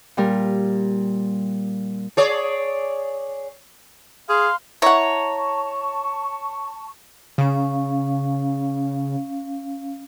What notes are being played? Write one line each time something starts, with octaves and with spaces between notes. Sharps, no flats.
A#2 G3 A#4
G#4 C#5 D5
G#4 F5 C6
E4 C#5 F#5 A5 A#5 C#6
C#3 C#4 F5